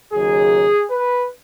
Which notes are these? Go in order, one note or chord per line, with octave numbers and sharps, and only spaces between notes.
D#2 C#3 F#3 G#4
B4